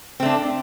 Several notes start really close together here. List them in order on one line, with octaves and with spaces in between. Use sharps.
C4 A3 D4